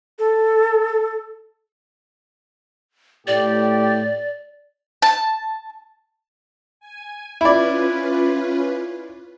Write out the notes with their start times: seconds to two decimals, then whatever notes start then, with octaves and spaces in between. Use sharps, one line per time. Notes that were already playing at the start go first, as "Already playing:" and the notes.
0.19 A4
3.27 A2 G4 D5
5.02 A5
6.80 G#5
7.41 C#4 E4 F4 B4 D5